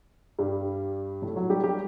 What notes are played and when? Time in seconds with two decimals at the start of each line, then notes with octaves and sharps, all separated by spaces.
0.39 G2 G3
1.22 A2 A3
1.36 F#3 F#4
1.50 G3 G4
1.63 G3 G4